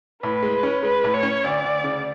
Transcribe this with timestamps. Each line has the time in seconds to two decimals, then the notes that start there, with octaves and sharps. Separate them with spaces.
0.22 A2 B4
0.43 G#3
0.63 C#4
0.83 G#3 B4
1.04 A2
1.14 C#5
1.23 C#4
1.43 D2 D5
1.63 D2
1.84 C#3